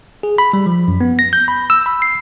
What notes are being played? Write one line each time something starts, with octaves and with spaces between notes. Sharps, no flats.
G#4
B5
G3
F3
F#2
B3
A#6
G6
B5
E6
B5
C7